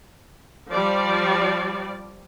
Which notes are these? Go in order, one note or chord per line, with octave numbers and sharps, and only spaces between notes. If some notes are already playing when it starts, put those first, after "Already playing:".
F3 G3 D5